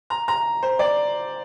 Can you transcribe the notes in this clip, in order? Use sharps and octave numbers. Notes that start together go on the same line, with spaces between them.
A#5
A#5
C5
D5